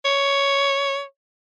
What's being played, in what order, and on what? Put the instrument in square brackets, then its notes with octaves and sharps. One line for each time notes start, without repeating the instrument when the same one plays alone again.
[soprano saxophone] C#5